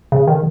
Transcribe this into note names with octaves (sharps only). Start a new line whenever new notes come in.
C#3
D#3